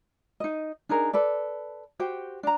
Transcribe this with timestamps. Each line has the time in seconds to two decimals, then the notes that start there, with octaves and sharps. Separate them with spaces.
0.40 D#4 D#5
0.89 D4 D#4 G#4 A#4
1.13 A4 B4 D5
1.99 F#4 G4 C5 G5
2.43 D4 A#5